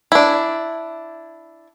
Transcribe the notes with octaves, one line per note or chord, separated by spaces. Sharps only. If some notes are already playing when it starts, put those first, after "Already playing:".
D4 E4